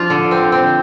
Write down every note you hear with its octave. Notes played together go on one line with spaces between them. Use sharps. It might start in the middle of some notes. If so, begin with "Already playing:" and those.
Already playing: F3 D4 F4 F5
D3
C4
C4